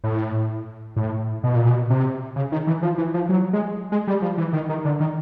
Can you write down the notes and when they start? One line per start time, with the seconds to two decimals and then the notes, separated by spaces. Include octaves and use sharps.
0.04 A2
0.96 A2
1.43 B2
1.55 A#2
1.69 B2
1.90 C3
2.36 C#3
2.52 D#3
2.67 E3
2.83 F3
2.98 E3
3.14 F3
3.29 F#3
3.53 G#3
3.92 G#3
4.08 G3
4.22 F3
4.38 E3
4.53 D#3
4.69 D#3
4.85 D3
5.00 D#3